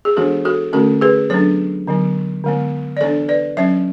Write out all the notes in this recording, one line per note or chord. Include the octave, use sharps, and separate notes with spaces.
G#4
E3 G#3 B3 D4 F#4 A4
F#4 A4
D3 A3 C#4 F#4 A4
G#4 B4
F#3 B3 D4 A4 C#5
D3 F#3 B3
D3 G#3 B3
D5
E3 B3 D4 A4 C#5
B4 D5
F#3 C#4 C#5 E5